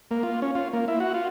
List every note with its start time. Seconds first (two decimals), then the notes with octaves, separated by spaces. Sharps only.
0.11 A#3
0.23 F4
0.42 C#4
0.55 F4
0.73 A#3
0.88 E4
1.00 F#4
1.14 F4